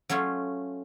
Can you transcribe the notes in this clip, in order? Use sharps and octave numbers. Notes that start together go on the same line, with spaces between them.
F#3 A3 C#4 F4